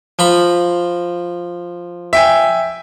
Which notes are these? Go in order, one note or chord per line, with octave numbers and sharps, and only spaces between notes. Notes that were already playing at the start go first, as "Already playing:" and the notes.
F3 A#5 B5
E5 G5 G#5